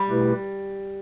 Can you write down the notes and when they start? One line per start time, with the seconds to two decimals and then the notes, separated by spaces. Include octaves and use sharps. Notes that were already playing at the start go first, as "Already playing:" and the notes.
Already playing: G3
0.09 B2 A3 E4 G4 B4